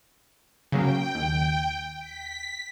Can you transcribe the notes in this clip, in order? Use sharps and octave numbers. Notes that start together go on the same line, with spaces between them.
C#3 F#3 A#3 G5
D#2
B6